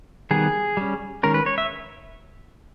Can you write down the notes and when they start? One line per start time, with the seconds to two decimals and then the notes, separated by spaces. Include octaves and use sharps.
0.31 D#3 G3 B3 G#4
0.77 G3 C#4
1.23 D#3 G#3 C#4 A#4
1.34 B4
1.46 C#5
1.58 E5